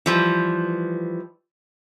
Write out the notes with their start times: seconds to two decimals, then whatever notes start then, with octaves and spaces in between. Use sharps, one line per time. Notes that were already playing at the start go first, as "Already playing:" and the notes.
0.06 E3 F3 G3